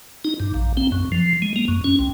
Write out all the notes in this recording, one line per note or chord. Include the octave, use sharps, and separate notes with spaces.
D#4
G2
A#1
C4
F#2
F3
G#3
A#3
F#2
C#4
C2